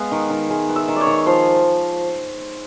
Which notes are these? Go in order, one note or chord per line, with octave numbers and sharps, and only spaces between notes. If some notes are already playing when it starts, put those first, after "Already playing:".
Already playing: G#3 B3 F5
D#3
D#3
G#3 E5
B3
E5
D#3
D5
C#5
D#3
F3 C5